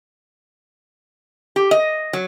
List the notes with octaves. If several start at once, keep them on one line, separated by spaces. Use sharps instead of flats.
G4
D#5
F#3